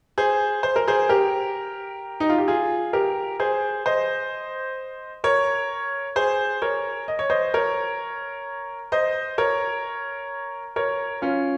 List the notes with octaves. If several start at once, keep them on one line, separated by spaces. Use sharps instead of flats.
G#4 C5
C5
A#4
G#4 C5
G4 A#4
D#4
F4
G4
F4 G#4
G4 A#4
G#4 C5
C5 D#5
A#4 C#5
G#4 C5
A#4 C#5
D#5
C#5
C5 D#5
A#4 C#5
C5 D#5
A#4 C#5
A#4 C#5
C#4 F4